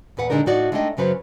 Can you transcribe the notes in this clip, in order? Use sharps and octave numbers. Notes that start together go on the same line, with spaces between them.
E2 A#2 B4 F#5
A#2 D3 G#3 D4 D#4 A#4
A2 D#4 F#4 D5
G#3 A3 D4 D#4 D#5 G5
F#2 C#3 F#3 B4 C5